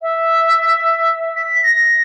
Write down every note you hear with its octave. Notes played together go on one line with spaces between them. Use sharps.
E5
B6
A#6